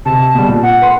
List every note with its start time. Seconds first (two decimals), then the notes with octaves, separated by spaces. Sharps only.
0.06 C3 A5
0.35 B2 G3
0.48 A#2
0.63 F#5
0.82 B4 C6